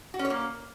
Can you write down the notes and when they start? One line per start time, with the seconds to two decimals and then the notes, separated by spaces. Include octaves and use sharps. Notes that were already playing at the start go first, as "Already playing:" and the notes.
0.14 F#4
0.19 C#4
0.25 C#5
0.30 A#3